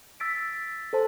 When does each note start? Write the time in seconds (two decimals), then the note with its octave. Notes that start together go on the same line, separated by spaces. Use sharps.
0.20 E6 A6 B6 D7
0.93 A4 C5 A5